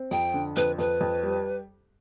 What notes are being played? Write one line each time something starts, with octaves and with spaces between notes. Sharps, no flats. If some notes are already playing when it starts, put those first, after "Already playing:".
Already playing: C4
F2 G5
D3
F2 B4
F2 B4
F2
G3